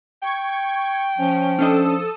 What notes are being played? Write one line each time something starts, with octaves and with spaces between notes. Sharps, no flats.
G5 C#6 G#6
F3 C#4
C#4 D4 A4 D#5 D#6 E6